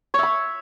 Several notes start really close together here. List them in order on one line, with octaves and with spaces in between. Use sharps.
C#5 E5 B5